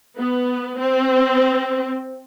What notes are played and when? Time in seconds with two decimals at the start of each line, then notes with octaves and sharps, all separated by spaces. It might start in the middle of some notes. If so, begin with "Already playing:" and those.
0.18 B3
0.78 C4